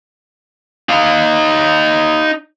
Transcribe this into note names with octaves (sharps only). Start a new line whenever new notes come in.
D#4 F5